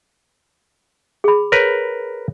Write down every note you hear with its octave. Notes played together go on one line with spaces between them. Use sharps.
G#4 B5
A#4 B4 C#5